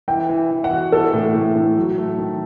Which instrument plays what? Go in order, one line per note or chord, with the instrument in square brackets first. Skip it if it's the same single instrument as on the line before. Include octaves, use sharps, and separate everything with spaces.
[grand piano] E3 [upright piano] G5
[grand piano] E3
E3
[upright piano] F#5
[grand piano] F#4
[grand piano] E3 [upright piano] A4
[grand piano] A2
A2
A2
F#3
A3
D#3